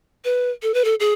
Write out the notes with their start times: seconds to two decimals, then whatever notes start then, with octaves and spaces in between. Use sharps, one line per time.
0.25 B4
0.63 A4
0.74 B4
0.85 A4
1.00 G#4